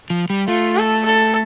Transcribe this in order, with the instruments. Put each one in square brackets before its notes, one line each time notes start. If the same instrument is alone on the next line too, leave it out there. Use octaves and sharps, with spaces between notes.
[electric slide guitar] F3
G3
[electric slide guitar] A3 [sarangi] F4
[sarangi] A4
A4